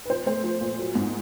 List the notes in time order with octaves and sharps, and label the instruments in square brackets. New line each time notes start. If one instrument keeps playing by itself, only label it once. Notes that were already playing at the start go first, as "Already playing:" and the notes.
[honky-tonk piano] B4
F3 C5
A3 C5
F3
A#2
F#3
G#2